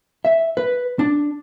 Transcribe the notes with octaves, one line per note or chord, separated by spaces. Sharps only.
E5
B4
D4